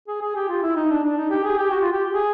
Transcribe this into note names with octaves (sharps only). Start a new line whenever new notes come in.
G#4
G#4
G4
F4
E4
D#4
D4
D4
D#4
G4
G#4
G4
F#4
F4
G4
G#4